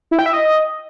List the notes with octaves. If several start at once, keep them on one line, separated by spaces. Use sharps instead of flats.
E4
G5
E5
D#5